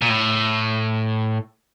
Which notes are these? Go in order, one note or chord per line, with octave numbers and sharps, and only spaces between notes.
A#2
A2